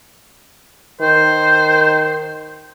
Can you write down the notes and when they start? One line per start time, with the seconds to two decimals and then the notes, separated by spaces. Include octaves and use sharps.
1.01 D#3 C5